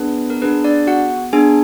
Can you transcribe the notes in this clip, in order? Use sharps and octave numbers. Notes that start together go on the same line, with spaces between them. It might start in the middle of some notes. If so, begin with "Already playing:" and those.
Already playing: B3 D4 G#4 B4
A#4
B3 D4 G#4 B4
D4 D5
F#4 F#5
B3 D4 G#4 G#5